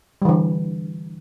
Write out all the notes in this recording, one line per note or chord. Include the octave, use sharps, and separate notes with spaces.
D3 E3 G3